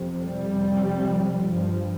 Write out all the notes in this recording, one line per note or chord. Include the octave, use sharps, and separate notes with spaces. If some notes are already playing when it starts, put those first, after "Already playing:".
Already playing: F2 C3
G3
F2 C3
G2 F3